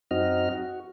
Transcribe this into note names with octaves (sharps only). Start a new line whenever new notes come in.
F#2 C4 D#4 F#4 D#5 F6
F#4